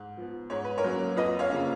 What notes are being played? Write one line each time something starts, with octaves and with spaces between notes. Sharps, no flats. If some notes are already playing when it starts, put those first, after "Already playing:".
Already playing: G#2
F3 B3
G#2 C#5
B4
A#4 C#5
F#3 A#3 C#4
F2 B4 D#5
C#5 F5
C#3 F3 A#3 C#4